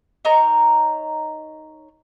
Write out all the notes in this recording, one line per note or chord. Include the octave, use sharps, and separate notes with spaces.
D#4 A#4 C#5 A#5